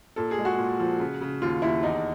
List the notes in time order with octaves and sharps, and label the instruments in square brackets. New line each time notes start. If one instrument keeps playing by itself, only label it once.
[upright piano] A#2 A4
G#4
G#3
F#4
A#2
F3
C#3
C#3
D#2 F4
D#2 E4
E2 D#4